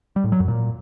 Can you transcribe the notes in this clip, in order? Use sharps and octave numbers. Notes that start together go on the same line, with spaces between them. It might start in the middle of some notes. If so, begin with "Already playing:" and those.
G3
A2
F#3
F#2
A#2